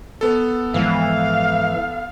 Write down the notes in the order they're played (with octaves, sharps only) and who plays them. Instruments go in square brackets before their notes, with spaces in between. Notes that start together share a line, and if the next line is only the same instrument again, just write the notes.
[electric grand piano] B3 A4
[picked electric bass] G#2 F3 G#3 [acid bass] E3 [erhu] F5